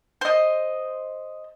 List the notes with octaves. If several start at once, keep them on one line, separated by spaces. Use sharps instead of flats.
C5 D#5